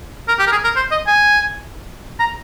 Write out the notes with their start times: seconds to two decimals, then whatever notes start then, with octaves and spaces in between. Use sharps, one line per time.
0.28 A#4
0.39 G4
0.47 A#4
0.52 G#4
0.64 A#4
0.76 C5
0.91 D#5
1.07 G#5
2.20 A#5